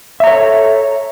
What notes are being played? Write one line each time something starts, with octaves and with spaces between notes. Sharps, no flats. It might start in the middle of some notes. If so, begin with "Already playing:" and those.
A4 C#5 E5 A#5